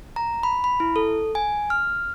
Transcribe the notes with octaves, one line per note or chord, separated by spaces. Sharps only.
A#5
B5
B5
E4
A4
G#5
F6